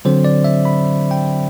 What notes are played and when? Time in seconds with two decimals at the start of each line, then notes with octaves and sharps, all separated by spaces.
0.05 D3 F#3 C4 C5
0.25 D5
0.44 E5
0.65 B5
1.11 G5